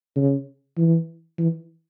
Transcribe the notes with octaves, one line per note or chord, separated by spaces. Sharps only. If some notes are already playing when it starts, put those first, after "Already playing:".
C#3
E3
E3